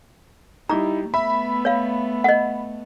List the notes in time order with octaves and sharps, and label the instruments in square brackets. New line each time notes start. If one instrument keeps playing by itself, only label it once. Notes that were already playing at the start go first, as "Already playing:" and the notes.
[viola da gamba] G3 [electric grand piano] D#4 E4 [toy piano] A#5 D6
[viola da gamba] A3 B3 [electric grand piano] E5 B5
[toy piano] C#5 F5
D#5 F#5